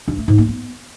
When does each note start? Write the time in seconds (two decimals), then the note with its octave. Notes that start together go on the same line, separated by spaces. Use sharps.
0.08 G2
0.18 A3
0.28 G#2
0.38 A#3
0.48 B3